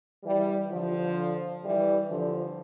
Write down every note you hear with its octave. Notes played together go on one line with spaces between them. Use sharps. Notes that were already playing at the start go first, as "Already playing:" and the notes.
E3 G3
D3 F3
E3 G3
D3 F3